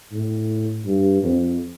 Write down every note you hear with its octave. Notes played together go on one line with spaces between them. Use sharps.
A2
G2
F2